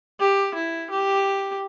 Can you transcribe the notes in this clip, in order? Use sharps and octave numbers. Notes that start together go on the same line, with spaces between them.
G4
E4
G4